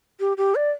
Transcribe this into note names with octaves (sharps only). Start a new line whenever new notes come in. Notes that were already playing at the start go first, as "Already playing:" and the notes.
G4
G4
D5